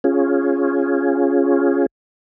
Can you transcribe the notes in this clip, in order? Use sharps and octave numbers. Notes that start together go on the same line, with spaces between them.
C#4 F4 G#4